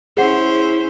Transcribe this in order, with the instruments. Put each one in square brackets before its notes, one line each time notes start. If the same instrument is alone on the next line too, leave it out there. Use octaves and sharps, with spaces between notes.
[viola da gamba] C#4 E4 C5 [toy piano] G#4 F#5